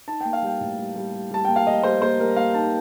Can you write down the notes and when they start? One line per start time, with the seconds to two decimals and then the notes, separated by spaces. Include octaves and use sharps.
0.08 D#4 A5
0.21 A#3 G5
0.33 F5
0.42 G3 G5
0.61 A2
0.78 G3
0.96 G3
1.13 G3
1.31 G3 A5
1.45 A#3 G5
1.56 F5
1.66 G3 D#5
1.83 G3 C5
2.02 A#3 C5
2.20 G3 A#4
2.36 A#3 F5
2.54 D#4 A5